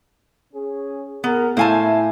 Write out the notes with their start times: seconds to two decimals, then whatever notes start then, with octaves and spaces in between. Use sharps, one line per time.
0.54 C#4 G#4
1.24 A2 B3 G#4 A#4
1.57 A2 E4 C5 F5 G#5 A5